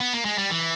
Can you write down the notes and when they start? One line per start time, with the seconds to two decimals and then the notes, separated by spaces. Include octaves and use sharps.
0.00 B3
0.13 A#3
0.25 G#3
0.38 G3
0.51 E3